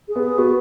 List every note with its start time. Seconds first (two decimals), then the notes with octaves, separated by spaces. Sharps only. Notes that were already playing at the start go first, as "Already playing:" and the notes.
0.09 G#4
0.15 B3
0.23 G#4
0.38 B3 F#4